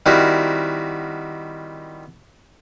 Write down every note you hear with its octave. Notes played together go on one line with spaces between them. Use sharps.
D#3 G3 C4 E4 F#4 A#4